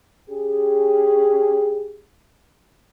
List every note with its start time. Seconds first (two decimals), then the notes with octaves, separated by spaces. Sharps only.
0.30 C#4 G4 G#4